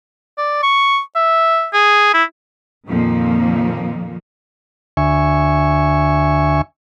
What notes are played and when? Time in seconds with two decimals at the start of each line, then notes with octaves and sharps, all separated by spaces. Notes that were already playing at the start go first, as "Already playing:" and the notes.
0.38 D5
0.63 C#6
1.16 E5
1.73 G#4
2.14 E4
2.88 F2 A#2 D#3 F3 A#3
4.97 D2 E5 G#5 C#6